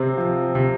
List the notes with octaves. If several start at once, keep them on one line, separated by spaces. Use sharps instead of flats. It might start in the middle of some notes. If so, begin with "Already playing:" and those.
Already playing: C3 C4
F3
C3